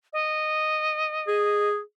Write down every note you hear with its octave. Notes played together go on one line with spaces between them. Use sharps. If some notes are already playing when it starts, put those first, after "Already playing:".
D#5
G#4